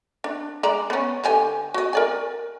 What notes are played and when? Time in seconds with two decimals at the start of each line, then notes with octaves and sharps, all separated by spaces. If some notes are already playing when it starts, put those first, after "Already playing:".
0.24 D4
0.63 G#3 D5 A#5
0.90 B3 C#4
1.24 D3 G4 G#5
1.74 F#4 D#5
1.93 A#4 D5 G#5